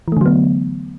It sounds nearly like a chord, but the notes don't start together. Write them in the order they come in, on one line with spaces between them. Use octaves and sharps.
E3 A3 D3 F#3 B3